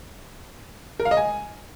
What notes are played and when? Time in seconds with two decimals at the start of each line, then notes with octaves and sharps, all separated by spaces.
1.00 A#4
1.05 F5
1.11 D#5
1.17 G#5